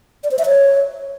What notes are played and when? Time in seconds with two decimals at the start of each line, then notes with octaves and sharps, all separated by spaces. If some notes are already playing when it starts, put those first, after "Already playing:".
0.24 D5
0.31 C5
0.39 E5
0.46 C#5